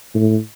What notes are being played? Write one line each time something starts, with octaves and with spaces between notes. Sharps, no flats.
A2